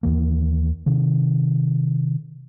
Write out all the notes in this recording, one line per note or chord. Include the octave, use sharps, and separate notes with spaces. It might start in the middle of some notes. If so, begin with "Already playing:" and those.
D#2 E3 A#3
C3 D#3